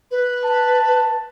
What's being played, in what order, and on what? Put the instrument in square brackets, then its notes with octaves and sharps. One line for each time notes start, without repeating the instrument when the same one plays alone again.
[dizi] B4
[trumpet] A5